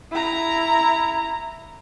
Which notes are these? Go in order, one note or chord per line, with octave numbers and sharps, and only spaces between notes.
E4 A#5